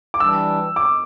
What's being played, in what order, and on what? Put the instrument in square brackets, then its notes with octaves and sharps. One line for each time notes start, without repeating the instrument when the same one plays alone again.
[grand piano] D6
[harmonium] E3 G3 D4 [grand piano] E6
[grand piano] D6